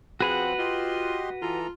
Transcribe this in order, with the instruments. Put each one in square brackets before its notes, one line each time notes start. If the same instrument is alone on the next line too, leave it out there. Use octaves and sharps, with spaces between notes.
[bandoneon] F3 C4 C5 [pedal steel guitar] F#4 B4 F#5 [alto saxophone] G#4
[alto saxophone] F4 [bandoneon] G4 D#5 C6
[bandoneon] E3 A4 A#5 [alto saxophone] F4